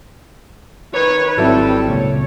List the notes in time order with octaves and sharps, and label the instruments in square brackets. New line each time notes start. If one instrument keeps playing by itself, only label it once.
[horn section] D#3 C#5 [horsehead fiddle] B4
[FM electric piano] G#1 F#3 E4 [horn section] G3 A4 [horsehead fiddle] C4
[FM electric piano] C#2 A#2 [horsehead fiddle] C#5